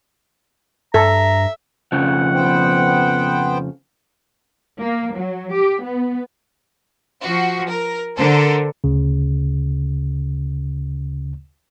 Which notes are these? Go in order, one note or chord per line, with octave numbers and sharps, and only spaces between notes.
G2 A4 E5 A#5
F2 C#3 F3 F#5
B3 C5 G5
A#3
F#3
G4
B3
F3 F#4
A#4
D3 A4 A#4 C5
D2 C#3